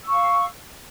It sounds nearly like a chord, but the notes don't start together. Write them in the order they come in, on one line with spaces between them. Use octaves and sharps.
E6 C#6 F5